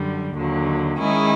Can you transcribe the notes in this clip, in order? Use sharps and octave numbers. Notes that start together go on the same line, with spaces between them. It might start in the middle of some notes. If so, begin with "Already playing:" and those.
Already playing: F#2 D3 G3
D#2 D3 F#3
D#3 G#3 C#4 E4 G#4